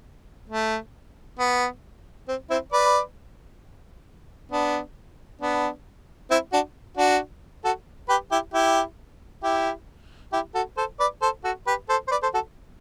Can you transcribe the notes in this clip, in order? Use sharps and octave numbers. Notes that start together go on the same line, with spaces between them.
A3
B3
C4
C4 E4
B4 D5
B3 D4
B3 D4
C4 E4
D4 F#4
D4 F#4
F#4 A4
G4 B4
E4 G4
E4 G4
E4 G4
E4 G4
F#4 A4
A4 C5
B4 D5
A4 C5
F#4 A4
G4 B4
A4 C5
C5
B4 D5
A4 C5
F#4 A4